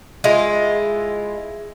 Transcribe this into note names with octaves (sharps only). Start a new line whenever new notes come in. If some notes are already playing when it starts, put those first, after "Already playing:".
G#3 E4 F4